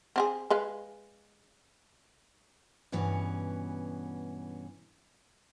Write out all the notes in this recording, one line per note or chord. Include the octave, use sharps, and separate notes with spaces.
C4 G4 G#4
G#3 B4 F5
G2 B2 E3 B3 C#4